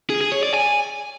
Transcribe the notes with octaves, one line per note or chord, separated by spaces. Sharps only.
G#4
G#4
C#5
D5
G#5